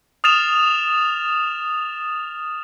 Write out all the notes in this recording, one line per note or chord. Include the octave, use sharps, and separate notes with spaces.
D#6 F6 A6 E7 F7